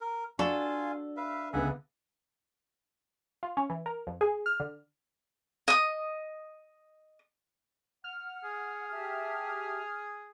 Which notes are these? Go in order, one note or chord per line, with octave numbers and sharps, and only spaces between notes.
A#4
D4 F4 F#4 A4 F5 G#5
B4 E5 F5
C#2 D3 B3 E5 F#5 G#5
F4
C#4
E3
A#4
F2
G#4
F6
D3
D#5 D#6
F#5 F6
G#4
G4 E5 A5